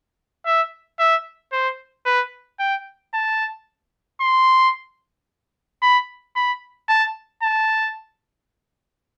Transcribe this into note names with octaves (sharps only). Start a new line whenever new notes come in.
E5
E5
C5
B4
G5
A5
C6
B5
B5
A5
A5